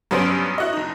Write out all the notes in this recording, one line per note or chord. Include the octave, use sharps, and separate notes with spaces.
G2 F#3 B3 C#4 C5 D7
E4 F#4 D#5
F#1 D#4